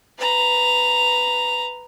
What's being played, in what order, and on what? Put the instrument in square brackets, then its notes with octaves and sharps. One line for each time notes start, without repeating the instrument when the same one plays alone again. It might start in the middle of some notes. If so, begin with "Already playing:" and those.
[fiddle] B4 A#5